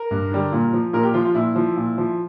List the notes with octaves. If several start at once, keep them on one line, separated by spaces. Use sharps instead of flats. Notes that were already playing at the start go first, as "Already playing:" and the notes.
Already playing: A#4
G2
D3 G3
A#2
F3
A#2 A#4
G4
F3 F4
F4
A#2 E4
F3
A#2
F3